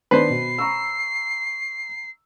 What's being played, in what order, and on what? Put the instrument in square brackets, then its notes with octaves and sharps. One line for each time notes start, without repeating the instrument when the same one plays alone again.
[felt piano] D#3 B3 D4 [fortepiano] B4 C5 [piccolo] C7
[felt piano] B2
A#5 C#6 E6